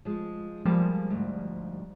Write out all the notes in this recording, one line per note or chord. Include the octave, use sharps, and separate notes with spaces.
F3 G#3
F3 G3 G#3 A#3 A5
D2 G#2